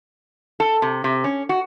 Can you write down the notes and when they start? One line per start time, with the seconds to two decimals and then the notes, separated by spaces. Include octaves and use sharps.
0.60 A4
0.82 C3
1.04 C3
1.24 C#4
1.49 F#4